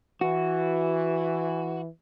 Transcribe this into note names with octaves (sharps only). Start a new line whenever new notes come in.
E3 F#4